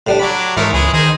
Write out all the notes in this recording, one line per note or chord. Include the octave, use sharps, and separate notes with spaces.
A2 G3 D4
F#3 D4 D5 B5
G#2 E3 G#3 A3 A#4 C#5
C#2 G#3 B3 G#4
D#3 D#4 G#4 C5